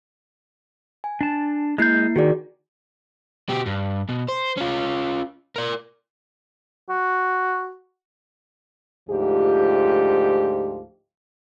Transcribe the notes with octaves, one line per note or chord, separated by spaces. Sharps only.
G#5
D4 A5
G#3 A#3 E4 G6 C7
D#3 F#4 G#4 D5
B2 G4
G2
B2
C5
C#4 F4
A#4 D5
F#4
D2 G#2 F3 F4 G4